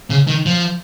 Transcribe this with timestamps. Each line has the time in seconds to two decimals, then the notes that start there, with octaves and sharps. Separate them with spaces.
0.10 C#3
0.27 D#3
0.46 F3